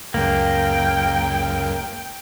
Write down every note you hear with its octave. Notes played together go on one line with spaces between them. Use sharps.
C#2 F#2 A#3 G5